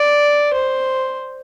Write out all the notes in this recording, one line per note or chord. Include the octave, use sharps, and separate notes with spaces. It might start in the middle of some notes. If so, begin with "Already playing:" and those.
Already playing: D5
C5